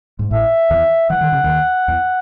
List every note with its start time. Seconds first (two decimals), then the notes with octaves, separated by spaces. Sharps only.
0.19 G#2
0.31 A1 A2 E5
0.70 E2 E3
1.10 E3 F#5
1.21 D#3
1.32 C#3
1.44 D#2 D#3
1.88 E2